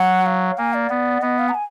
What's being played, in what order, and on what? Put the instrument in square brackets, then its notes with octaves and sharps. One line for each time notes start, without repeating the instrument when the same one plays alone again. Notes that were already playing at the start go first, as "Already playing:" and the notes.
Already playing: [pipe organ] F#3 [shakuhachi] F#5
[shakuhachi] F5
[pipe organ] A#3 [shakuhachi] G#5
[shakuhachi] D5
[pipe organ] B3
[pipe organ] B3 [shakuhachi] D#5
[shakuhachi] F5
A#5
G#5